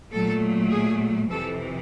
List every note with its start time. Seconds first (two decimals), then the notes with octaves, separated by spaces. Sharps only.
0.11 A#2 F#3 A3 A4
0.71 G#4
1.31 F2 C3 E3 A4